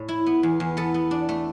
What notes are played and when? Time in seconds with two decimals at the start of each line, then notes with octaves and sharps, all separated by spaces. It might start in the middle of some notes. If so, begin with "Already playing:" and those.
Already playing: A2
0.09 E4
0.26 B3
0.43 E2
0.60 E2
0.77 B3 A4
0.94 B3
1.11 D4
1.29 A3